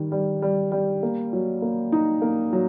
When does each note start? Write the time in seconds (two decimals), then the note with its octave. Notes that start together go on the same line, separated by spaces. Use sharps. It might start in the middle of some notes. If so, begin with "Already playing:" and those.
Already playing: D#3 G3
0.12 G3
0.42 G3
0.72 G3
1.03 A#3
1.33 F#3
1.62 A#3
1.92 D#4
2.22 A#3
2.53 F#3